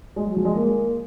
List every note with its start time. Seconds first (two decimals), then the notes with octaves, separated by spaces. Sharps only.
0.16 G#3
0.26 F#3
0.36 F3
0.45 G#3
0.55 A#3